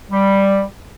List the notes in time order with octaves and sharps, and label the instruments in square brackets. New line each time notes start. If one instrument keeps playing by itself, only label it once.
[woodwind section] G3